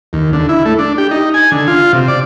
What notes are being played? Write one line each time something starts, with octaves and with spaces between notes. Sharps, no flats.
D#2
D3
E4
A3
D4
G4
D#4
G#5
D3
F4
C3
D5